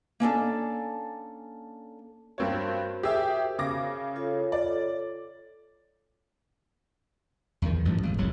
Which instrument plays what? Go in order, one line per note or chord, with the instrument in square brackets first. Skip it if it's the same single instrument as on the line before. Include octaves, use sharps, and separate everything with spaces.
[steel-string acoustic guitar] A#3 C#4 D4 A4
[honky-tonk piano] G2 C4 C#5 [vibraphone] F#4 A#4 C5
[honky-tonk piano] G4 G#4 E5
C#3 D6 A#6
[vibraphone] F4 A4 C#5
[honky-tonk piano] D5
[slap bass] E2 D#3
A1 G2 F3
G#1
E1 C2 F#3